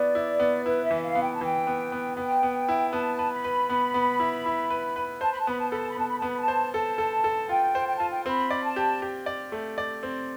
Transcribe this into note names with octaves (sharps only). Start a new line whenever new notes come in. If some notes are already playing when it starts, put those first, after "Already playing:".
Already playing: B3 E4 D5
E4
B3
E4 B4
E5
E3
F5
B3
G5
A5
E3 G5
B3
B3
B3 G5
B3
E4
B3 A5
B4
B5
B4
B3
B3
E4
E4
B4
B4
C5 A5
B5
A5
B3 B5
A5
A4 B5
A5
B5
B3 A5
B5
B3 A5
B5
A5
C5
A4 A5
A4
A4
F4 G5
C5
G5
F4 A5
G5
C4 B5
D5
A5
G4
G4
D5
A3
D5
C4